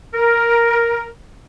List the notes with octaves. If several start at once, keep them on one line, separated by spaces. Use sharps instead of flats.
A#4